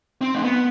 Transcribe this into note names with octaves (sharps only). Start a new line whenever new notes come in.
C4
A3
B3